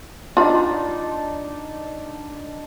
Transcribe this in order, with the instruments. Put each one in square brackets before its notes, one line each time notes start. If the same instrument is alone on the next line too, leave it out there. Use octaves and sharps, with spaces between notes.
[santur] D4 D#4 [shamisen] F4 B5